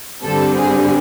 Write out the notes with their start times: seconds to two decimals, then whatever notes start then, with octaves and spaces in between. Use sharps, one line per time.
0.23 G2 D3 G3 C4 A4
0.57 G#4